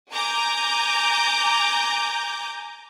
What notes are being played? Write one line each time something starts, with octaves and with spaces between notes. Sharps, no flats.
G#5 A#5 D6 G6